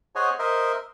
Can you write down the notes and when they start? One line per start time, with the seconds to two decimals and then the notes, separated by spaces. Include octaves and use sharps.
0.15 G#4 C5 C#5 D#5 F#5 G#5
0.39 A#4 C5 D#5 E5